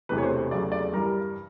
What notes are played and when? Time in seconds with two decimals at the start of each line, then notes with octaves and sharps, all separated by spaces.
0.09 E1 E2 C3 E3 A3 B4
0.18 C#5
0.23 C5
0.51 E2 C#3 F#3 A3 D5
0.72 D5
0.93 G2 E3 G3 A#4